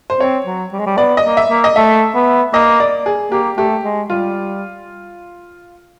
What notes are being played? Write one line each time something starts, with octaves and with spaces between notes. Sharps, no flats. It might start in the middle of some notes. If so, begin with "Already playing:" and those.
C5
C4 C#5
F#3
G3
G#3
G3
B3 D5
D#5
A#3
E5
A#3
D#5
A3 E5
B3
A#3 D#5
D5
G#4
A#3 G4
A3 G4
G#3
G3 F4